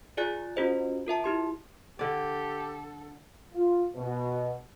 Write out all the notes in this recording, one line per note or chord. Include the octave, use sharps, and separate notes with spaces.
F4 G#4 D5 G#5 F#6 A6
C#4 F4 F#4 G#4 C5 D#5
F4 A#4 E5 A5
E4 G4 C6
D3 G4 A4 D5
F4
B2